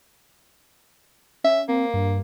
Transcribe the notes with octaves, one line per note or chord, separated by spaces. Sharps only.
C#4 E5
A#3 C4
G2